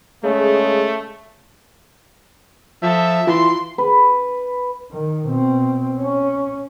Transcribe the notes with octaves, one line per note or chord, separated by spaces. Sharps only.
C#3 G#3 A3
F3 A4 E5
E3 F4 C6
B4
D#3
B2 C4
C#4